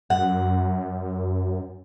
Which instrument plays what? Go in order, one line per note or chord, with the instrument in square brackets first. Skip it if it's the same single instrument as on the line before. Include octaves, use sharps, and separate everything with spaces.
[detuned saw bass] F#2 [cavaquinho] F#5